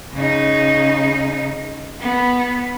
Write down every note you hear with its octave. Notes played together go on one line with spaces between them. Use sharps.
C#3 D#4
B3